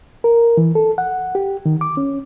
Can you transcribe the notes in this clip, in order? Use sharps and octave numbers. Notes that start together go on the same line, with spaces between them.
A#4
E3
A4
F#5
G4
D#3
D6
C#4